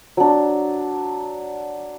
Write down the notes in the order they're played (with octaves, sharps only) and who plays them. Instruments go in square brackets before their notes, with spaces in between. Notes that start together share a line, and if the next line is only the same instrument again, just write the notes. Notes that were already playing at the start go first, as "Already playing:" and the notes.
[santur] F#3 D4